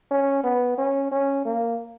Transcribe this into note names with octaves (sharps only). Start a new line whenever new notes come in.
C#4
B3
C#4
C#4
A#3